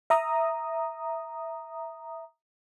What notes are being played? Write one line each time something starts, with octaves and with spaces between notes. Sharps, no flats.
E5 A#5 D#6